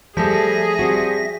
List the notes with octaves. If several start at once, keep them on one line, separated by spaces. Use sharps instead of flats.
F3 G3 A3 G#4 A4 E5 A#6
G3 C4 F#4